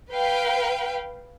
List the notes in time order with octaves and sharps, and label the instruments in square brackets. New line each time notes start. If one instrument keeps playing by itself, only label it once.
[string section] B4 F5 G5